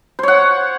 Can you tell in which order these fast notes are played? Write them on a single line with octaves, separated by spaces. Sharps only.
C5 C#5 F#5